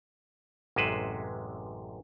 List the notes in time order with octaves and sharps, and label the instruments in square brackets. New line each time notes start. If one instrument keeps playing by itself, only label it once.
[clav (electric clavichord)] A1 F#2 C3 G#3 B4 C5